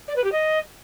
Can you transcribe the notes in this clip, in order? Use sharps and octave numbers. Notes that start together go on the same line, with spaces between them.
D5
B4
G4
D#5